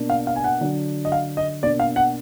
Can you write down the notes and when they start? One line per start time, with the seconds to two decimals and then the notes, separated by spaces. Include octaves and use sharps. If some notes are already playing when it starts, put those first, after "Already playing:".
Already playing: B2 A#3 D4
0.10 F5
0.27 F5
0.36 G#5
0.44 F#5
0.60 D3 F#3 D4
1.05 D#5
1.12 F5
1.37 D#5
1.62 B2 A#3 D4 D5
1.80 F5
1.96 F#5